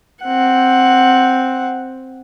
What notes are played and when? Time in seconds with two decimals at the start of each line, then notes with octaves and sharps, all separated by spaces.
0.24 C4 F#5